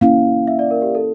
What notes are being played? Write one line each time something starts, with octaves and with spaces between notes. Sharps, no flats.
A#3 C#4 E4 F5
E5
D5
A#4
G4
A4